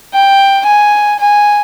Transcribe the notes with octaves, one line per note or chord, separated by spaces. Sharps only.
G5
G#5
G#5